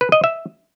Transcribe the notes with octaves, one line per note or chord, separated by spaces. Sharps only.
B4
D#5
E5